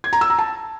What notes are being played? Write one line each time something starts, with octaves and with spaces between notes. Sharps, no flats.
G#6
A#5
E6
A#5
A5